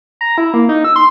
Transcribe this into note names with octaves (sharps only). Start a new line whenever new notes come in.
A#5
E4
A#3
D#4
E6
C6